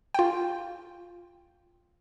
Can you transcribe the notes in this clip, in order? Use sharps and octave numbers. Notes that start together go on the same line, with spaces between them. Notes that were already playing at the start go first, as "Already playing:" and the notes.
F4 G5